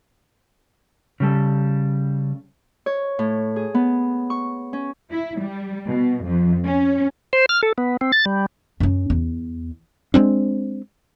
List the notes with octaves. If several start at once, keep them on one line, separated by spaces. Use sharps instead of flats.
C#3 G3 A4
C#5
A2
G#4
B3
C#6
C#4
E4
G3
B2
F2
C#4
C5
F6
A4
B3
C4
A6
G3
F#2 C#4
E2
G#3 A#3 C4 D4